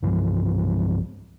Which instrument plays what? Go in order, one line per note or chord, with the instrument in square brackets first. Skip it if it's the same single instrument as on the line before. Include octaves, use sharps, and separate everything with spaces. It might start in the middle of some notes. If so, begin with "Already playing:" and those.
[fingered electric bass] C2 G2 E3 F3